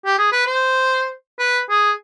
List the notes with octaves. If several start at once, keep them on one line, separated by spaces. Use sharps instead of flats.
G4
G#4
B4
C5
B4
G#4